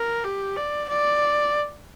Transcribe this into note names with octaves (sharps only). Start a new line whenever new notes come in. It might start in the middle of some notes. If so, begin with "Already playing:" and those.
Already playing: A#4
G4
D5
D5